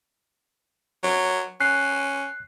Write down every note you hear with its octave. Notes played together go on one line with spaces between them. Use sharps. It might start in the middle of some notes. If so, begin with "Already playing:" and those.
F#3
C#4 F#6 C7